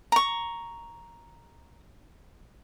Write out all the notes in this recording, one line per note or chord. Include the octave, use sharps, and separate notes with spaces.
A#5 C#6